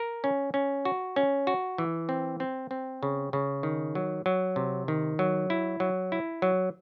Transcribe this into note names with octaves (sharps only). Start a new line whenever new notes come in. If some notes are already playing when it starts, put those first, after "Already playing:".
Already playing: A#4
C#4
C#4
F#4
C#4
F#4
E3
C4
C4
C4
C#3
C#3
D#3
F#3
F#3
C3
D#3
F#3
E4
F#3
E4
F#3